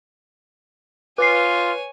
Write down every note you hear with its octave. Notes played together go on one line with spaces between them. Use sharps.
F4 B4 C#5 G#5 D6 C7